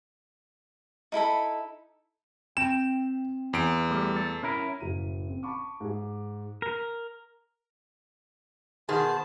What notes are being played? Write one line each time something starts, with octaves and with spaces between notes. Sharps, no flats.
D#4 E4 A4 B5
C4 G5 E7
E2 D7
G3 A3
A4
C#4 E4 A#4
F#1 A2 D#7
C4
A5 B5 C#6 D6
G#2 G#4
A#4
B2 D#3 B3 G#4 C5 A5